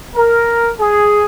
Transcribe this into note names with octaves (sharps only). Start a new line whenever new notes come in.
A#4
G#4